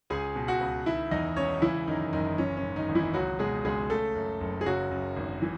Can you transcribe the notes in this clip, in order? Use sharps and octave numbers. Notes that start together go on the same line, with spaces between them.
C#2 G#4 G#5
B2
F#4 F#5
C#2
D#3 E4 E5
E2 D#4 D#5
E1 C#4 C#5
C#3 E3 E4
F#2 D#3 D#4
F#1 D#3 D#4
E3 C#4
C#4
G#2
D#3 D#4
G#1
E3 E4
C#2 F#3 F#4
B2 G#3 G#4
C#2 G#3 G#4
C#3 A3 A4
F#2
F#1
G#4
C#3 F#3 F#4
F#2
G#1
E3